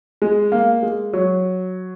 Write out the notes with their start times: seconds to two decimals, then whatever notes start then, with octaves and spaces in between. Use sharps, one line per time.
0.22 G#3
0.52 A#3
0.83 G#3
1.13 F#3